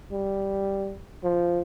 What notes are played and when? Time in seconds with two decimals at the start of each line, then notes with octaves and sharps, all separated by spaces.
0.12 G3
1.24 F3